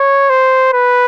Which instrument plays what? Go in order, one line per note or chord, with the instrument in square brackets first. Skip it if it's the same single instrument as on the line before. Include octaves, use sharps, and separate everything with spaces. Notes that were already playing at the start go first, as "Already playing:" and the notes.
Already playing: [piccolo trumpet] C#5
C5
B4